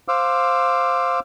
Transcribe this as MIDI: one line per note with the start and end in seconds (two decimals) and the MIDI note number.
0.08 1.20 72
0.08 1.20 77
0.08 1.20 86
0.08 1.20 88